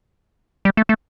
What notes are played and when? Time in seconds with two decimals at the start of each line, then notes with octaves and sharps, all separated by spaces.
0.65 G3
0.77 A3
0.89 A3